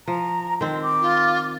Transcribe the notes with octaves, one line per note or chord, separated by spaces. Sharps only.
F3 A#5
D#3 C4 C6
D6
F4